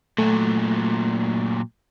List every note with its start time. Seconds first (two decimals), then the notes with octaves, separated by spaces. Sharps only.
0.18 A#2 F#3 A3